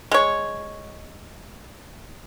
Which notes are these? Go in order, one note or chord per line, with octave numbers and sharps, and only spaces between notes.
G#3 C#5